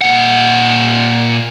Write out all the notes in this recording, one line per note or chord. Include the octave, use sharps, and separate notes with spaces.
A#2 F#5